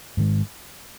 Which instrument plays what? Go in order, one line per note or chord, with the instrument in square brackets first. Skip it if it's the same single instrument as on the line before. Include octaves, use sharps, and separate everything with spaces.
[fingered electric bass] G#2 D#3 G#3